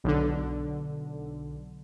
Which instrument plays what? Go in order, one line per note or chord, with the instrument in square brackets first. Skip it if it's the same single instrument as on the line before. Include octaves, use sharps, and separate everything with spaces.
[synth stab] B1 D3